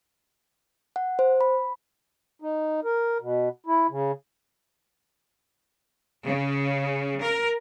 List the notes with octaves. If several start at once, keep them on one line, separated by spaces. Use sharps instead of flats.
F#5
C5
B5
D#4
A#4
B2
E4
C#3
C#3
A#4